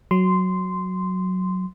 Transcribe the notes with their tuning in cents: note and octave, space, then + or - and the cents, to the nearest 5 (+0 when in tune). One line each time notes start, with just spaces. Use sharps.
F#3 +0 C6 -10